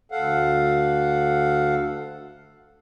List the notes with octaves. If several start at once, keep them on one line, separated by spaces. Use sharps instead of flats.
D2 A4 F5 F#5